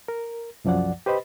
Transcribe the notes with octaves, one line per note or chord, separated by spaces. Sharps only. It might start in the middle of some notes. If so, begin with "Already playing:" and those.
A#4
C2 F#2 F3 D5 F#5
G4 B4 C5 D#5 B5